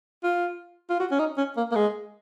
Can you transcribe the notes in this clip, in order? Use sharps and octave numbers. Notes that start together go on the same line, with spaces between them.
F4
F4
F#4
C#4
D#4
C#4
A#3
A#3
G#3